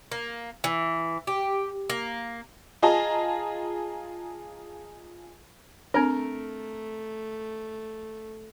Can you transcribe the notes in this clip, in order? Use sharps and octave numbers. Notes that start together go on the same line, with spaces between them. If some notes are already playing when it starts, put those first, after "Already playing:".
A#3
E3
G4
A#3
F4 G#4 D#5 A5 A#5
A3 C4 D4 A#4